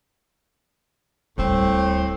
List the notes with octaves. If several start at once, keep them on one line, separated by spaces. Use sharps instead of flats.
D1 A2 G3 C4